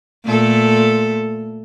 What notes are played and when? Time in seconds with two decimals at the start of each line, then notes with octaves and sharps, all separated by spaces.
0.25 A#2 A3 A4